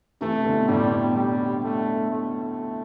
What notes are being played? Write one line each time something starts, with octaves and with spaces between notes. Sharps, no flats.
C3 E3 A3
B2 D3
A2 C3 G3
C3
B2
G3
A3
A3